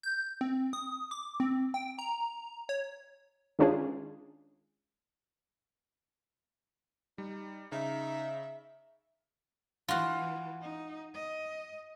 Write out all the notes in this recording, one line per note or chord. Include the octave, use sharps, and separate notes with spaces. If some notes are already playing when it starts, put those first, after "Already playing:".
G6
C4
D#6
D6
C4
G5
A#5
C#5
D#3 G#3 C#4 D4 F4 G#4
G3 D#4
C#3 D#4 E5
E3 F4 F#4
D#4
D#5